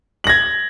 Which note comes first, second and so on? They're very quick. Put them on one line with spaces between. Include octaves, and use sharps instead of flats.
F#7 A#6 G#6